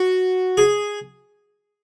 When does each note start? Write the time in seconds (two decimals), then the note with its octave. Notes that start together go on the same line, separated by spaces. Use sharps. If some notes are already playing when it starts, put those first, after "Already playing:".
Already playing: F#4
0.57 G#4